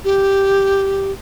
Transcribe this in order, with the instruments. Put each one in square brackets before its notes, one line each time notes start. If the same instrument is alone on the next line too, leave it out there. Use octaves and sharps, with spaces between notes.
[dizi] G4